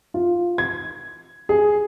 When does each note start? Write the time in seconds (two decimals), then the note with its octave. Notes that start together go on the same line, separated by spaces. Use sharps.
0.14 F4
0.58 G#6
1.49 G#4